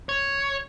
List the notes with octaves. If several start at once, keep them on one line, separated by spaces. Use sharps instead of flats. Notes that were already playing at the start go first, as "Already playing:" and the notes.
C#5